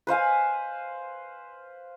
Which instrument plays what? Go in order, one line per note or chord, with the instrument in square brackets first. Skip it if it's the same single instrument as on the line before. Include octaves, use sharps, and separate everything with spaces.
[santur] B4 C5 F5 G#5